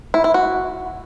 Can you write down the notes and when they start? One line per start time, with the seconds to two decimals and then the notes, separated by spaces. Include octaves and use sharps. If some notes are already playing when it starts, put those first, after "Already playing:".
0.14 E4
0.24 E4
0.34 F#4